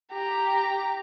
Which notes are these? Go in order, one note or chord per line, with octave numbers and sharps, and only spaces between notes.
G4 A#5